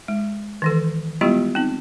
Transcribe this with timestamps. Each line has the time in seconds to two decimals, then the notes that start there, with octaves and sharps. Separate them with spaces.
0.08 G#3
0.62 D#3 E3 A4
1.21 G3 G#3 B3 E4 F4 G4
1.55 C4 D#4